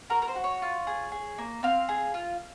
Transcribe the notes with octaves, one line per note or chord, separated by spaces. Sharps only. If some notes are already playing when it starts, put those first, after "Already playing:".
F#4 A#4
A#4
C5
F#4
C#5
F4
G#4
G#4
A#3
C4 F5
G#4
F4